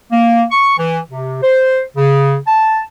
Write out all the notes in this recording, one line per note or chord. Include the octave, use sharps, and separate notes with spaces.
A#3
C#6
E3
C3
C5
C#3
A5